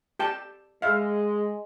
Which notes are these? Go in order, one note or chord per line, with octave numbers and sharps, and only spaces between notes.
G4 G5 A5
G#3 E5 F5